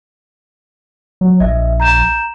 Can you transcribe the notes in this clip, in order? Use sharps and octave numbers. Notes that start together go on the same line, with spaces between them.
F#3
A#1 D#5 E5
A#5 G6 E7